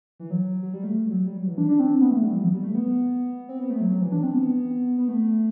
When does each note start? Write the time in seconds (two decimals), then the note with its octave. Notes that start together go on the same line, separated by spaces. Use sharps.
0.20 E3
0.31 F#3
0.63 F#3
0.73 G3
0.83 A3
1.10 F#3
1.26 G3
1.37 F#3
1.47 E3
1.58 D4
1.69 D4
1.79 C4
2.01 B3
2.11 A3
2.22 G3
2.33 E3
2.42 F#3
2.53 G3
2.64 A3
2.75 B3
3.49 C4
3.60 B3
3.70 A3
3.81 F#3
3.91 F#3
4.02 E3
4.12 D4
4.23 C4
4.34 B3
4.98 B3
5.08 A3